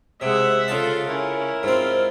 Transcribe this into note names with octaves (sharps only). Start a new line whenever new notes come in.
C3 G#3 G#4 E5 F#5
C#3 F4 A4 A5
C#4 E4 A#4
G#2 C4 F4